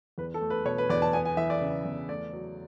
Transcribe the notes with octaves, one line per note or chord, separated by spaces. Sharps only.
E2 B4
A4
A3
B4
B2 C#5
B4
E2 D5
A5
B3 G#5
G#5
E3 E5
D5
C#3
E2
A3 D5
F#3